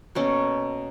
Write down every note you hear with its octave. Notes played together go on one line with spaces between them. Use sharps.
B2 A#3 C#4 A4